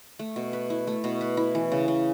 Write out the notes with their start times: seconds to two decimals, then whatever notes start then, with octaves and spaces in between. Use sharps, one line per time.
0.19 A3
0.36 B2
0.53 B4
0.70 E4
0.87 A3
1.04 B2
1.21 B4
1.37 E4
1.55 E3
1.72 C#3
1.88 C#3